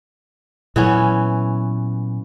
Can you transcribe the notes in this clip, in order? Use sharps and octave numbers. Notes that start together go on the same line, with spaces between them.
A#2 E3 F#3 B3 C#4